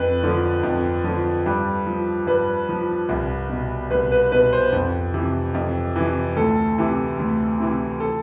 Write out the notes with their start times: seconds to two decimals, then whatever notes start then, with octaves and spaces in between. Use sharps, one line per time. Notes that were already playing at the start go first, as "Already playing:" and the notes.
Already playing: F2 B4
0.23 D3 F3
0.63 F2
1.04 D3 F3
1.46 G2
1.86 F3
2.27 G2 B4
2.69 F3
3.09 C2
3.50 B2
3.90 C2 B4
4.12 B4
4.32 B2 B4
4.53 C5
4.72 F2
5.14 C3 E3
5.54 F2
5.96 C3 E3
6.36 D2 A4
6.78 C3 E3
7.19 D2
7.60 C3 E3
8.00 A4